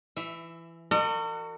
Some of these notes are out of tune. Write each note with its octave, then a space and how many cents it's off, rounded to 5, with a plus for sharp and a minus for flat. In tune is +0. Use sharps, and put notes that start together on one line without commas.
E3 +20 E5 +0
F#4 +0 A#4 -45 D#5 -40